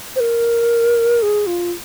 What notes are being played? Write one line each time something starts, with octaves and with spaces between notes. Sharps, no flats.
C5
A#4
G#4
F4